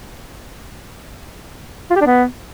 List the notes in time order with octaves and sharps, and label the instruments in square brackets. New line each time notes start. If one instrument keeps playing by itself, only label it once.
[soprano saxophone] F4
G4
D4
B3